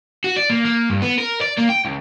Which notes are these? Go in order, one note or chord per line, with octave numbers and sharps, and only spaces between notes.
F#4
D5
A#3
A#3
G2
B3
A#4
D5
A#3
G5
C#2